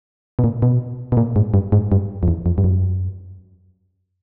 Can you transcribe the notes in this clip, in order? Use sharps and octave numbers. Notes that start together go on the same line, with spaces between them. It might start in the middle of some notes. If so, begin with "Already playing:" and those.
B2
A#2
B2
B2
A#2
G#2
G2
G#2
G2
F2
E2
F2
G2
F#2